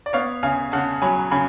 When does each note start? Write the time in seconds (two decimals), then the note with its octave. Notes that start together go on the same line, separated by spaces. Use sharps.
0.06 D5
0.13 B3 C#5 F5
0.43 C#3 F5 G#5
0.72 C#3 F#5 A5
1.02 F#3 G#5 B5
1.31 C#3 G#5 B5